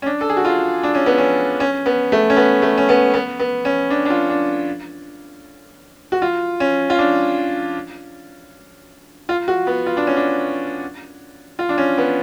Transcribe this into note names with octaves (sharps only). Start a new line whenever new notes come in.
C#4
D4
A4
G#4
F#4
F4
D4
C#4
B3
C#4
C#4
B3
A3
C#4
B3
A3
C#4
B3
B3
B3
C#4
D4
D4
F4
D4
F#4
F4
C#4
F4
D4
F4
F#4
B3
F4
D4
C#4
D4
F4
D4
C#4
B3